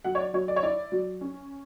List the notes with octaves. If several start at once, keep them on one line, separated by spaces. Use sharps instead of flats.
F#3 F#5
C#5
D5
F#3 C#5
D5
C#5
E4 D5
F#3
C#4